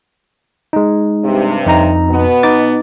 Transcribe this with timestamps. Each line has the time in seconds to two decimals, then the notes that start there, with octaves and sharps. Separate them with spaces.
0.73 G#3 D#4
1.25 G2 C3
1.66 F2 D#4 A#5
2.08 B2 B3
2.43 D#4 D6 A6